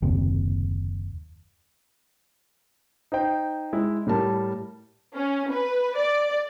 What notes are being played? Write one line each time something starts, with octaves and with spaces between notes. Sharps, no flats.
F#1 D#2 C3
D#4 C5 G5
G#3 E4
A2 G3 A#4 A5
C#4
B4
D5